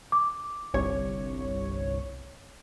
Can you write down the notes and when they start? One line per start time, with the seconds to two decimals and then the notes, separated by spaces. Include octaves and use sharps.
0.12 D6
0.74 G1 C2 C#5